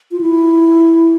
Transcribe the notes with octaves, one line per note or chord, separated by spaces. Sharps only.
F4
E4